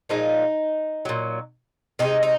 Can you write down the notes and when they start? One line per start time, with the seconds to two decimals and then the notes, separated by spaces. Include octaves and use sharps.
0.09 A#2 F3 G#3 D#4
1.05 A#2 F#3
1.99 C3 D#3 G#3 D#4
2.23 D#4